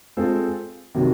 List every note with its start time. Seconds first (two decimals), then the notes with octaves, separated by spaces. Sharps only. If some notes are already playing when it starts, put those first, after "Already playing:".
0.17 G#3 C4 F4 A4 C5
0.95 C3 D#3 F#3